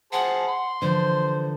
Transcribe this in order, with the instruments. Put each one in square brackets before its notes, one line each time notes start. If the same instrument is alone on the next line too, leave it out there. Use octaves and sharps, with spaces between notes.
[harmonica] G#4 C5 A5 [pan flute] F#5
[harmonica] C6
[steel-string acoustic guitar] D3 E3 F3 [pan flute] C5